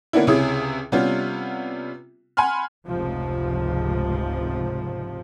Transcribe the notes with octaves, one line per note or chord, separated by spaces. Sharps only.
D3 A#3 B3 C#4 D4 E4
C#2 C3 C#4 E4 G#4 D#6
C3 G3 B3 C#4 F4
F#5 G#5 B5 C6 F6
F1 C#2 G#2 C3 F3